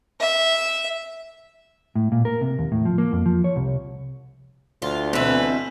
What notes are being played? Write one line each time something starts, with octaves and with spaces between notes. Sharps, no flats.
E5
A2
A#2
A#4
C3
D#2
A2
F3
A#3
F2
F3
C#5
C2
D2 F4
B2 E3 C4 B4